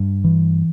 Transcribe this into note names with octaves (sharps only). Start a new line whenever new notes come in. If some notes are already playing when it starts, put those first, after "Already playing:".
Already playing: G2
E3